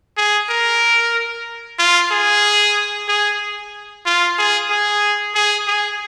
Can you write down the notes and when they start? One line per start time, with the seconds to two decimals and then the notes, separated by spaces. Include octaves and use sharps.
0.17 G#4
0.49 A#4
1.79 F4
2.11 G#4
3.08 G#4
4.06 F4
4.38 G#4
4.70 G#4
5.35 G#4
5.68 G#4